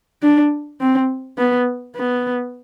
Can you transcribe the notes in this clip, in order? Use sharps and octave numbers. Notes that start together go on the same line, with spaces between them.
D4
C4
B3
B3